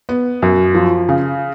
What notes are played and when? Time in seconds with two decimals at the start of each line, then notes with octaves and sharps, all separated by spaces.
0.09 B3
0.42 F#2
0.75 F3
1.09 C#3